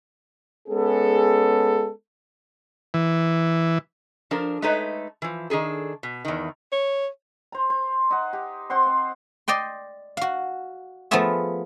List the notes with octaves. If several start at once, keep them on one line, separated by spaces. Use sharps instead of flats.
G#3 B3 C#4 G#4 A4
E3
F3 D4 A4 A#4
G#3 A3 D#4 A4 B4 C#5
E3 F3
D#3 D4 G#4 A4
B2
E2 D#3
C#5
C5 A#5
C5
D#4 F#5
G4
C4 C5 F#5 C6
C4
D5 D#5 G5 C6
F#4 F5
F3 A3 B3 F4 G#4 E5